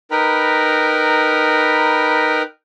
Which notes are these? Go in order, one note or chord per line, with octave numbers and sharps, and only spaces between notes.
D#4 A#4 B4 G5 A#5 B5